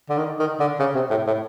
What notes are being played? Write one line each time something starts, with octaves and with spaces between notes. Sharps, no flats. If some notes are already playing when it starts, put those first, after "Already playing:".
D3
D#3
D#3
D3
C#3
C3
A2
A2